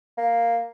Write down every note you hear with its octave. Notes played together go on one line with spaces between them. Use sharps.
A#3